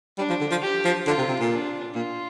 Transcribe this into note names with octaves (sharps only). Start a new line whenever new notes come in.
G3 D4
F3
D3
F3
G4
F3
D3 F4
C3
C3
A#2
D4
A#2 F4